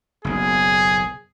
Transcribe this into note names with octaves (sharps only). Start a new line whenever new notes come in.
F#1 B1 G#4